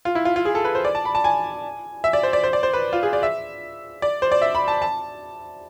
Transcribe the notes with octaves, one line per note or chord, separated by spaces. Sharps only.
F4
E4
F4
F4
G#4
A4
B4
C5
D5
A5
B5
A5
G#5
E5
D5
C5
D5
C5
D5
C5
B4
F4
G#4
D5
E5
D5
C5
D5
E5
B5
A5
A5